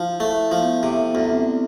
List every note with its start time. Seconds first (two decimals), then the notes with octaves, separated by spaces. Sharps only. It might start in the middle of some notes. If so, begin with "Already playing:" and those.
Already playing: F3 E4
0.12 E4
0.20 A3
0.52 F3
0.60 B3
0.83 C3
1.07 B3
1.15 D2
1.30 C4